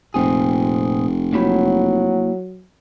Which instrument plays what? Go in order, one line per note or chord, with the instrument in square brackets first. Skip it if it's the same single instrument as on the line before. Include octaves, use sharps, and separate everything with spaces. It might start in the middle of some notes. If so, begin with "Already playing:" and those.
[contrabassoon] F1 [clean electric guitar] A#2 C4 G#4
[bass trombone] F#3 [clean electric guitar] A#3 E4 B5